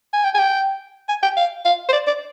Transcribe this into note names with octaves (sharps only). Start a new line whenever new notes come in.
G#5
G5
G#5
G5
G#5
G5
F5
F5
C5
D5
D5